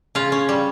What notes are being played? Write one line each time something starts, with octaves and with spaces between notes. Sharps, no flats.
C#3 F4 F5
C#4
G3